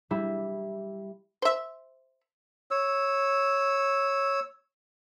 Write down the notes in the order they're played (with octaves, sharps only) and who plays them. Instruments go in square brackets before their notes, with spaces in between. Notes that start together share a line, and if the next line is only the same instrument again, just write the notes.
[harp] G3 E4
[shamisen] C5 E5
[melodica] C#5 E6